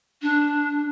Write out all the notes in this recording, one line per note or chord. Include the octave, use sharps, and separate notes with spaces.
D4